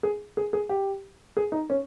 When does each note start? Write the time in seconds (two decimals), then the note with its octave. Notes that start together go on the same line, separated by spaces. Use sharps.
0.03 G#4
0.37 G#4
0.53 G#4
0.69 G4
1.37 G#4
1.52 D#4
1.70 C#4